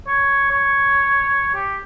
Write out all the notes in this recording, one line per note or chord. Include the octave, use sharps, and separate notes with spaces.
C#5
C#5
G4